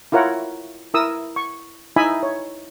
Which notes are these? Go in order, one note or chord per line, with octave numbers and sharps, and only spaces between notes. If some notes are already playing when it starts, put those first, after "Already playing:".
E4 F4 A#4 C#5 F#5
E4 A#4 D#6 E6
C#6
D#4 E4 D#5 E5 G#5 B5
C#5